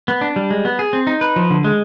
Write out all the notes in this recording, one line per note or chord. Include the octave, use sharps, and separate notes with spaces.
B3
D4
G3
G#3
B3
G#4
C4
D#4
B4
F3
D3
G#3